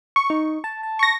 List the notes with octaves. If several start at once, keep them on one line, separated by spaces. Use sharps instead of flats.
C#6
D#4
A5
A5
C#6 A#6